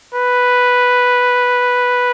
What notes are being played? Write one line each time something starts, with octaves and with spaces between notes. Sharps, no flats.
B4